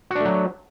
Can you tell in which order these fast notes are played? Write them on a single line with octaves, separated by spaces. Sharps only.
F#4 D4 A3 F#3